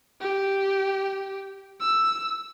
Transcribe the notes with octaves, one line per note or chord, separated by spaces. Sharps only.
G4
E6